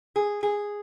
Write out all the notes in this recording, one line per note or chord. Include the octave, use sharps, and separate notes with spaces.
G#4
G#4